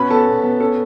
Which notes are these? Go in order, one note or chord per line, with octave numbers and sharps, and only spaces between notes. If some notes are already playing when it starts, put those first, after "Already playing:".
Already playing: B2 C#4 B4 B5
B3 A4 A5
B2
B3
C#4 A4